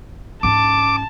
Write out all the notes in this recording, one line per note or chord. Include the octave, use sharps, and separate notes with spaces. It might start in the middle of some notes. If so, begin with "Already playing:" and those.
G#2 C#4 A5 D6